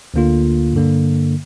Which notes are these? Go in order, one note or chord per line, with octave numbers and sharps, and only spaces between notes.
D2 D3 A#3 F4
G2 D3 A#3